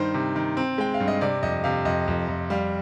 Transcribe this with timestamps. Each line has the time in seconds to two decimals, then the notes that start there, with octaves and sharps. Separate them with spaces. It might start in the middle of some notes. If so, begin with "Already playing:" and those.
Already playing: G2 D#3 C5
0.14 C3
0.36 D#3
0.57 C4
0.78 G#3 G5
0.94 F5
1.00 G2
1.08 D#5
1.21 C3 D5
1.43 F2 D#5
1.64 C3 F5
1.85 F2 D#5
2.08 F2
2.28 F2
2.50 G3 F5